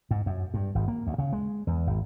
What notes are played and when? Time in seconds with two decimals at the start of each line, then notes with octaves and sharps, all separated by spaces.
0.11 G#2
0.26 F#2
0.54 G2
0.75 G#1
0.88 A#3
1.07 D2
1.18 C#3
1.33 G#3
1.67 E2
1.87 G#1